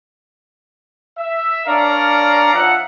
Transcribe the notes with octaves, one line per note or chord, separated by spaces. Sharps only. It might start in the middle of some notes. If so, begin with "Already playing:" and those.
E5
D4 A#4 C#5 D5 F5 A#5
F3 D#4 E5 F#5